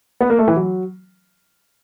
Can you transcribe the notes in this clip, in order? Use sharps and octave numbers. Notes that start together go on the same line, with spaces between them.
B3
A#3
A3
E3
F#3